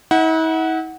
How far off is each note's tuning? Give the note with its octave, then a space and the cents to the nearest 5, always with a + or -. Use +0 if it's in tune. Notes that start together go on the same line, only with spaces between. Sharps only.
E4 -45 F#5 +0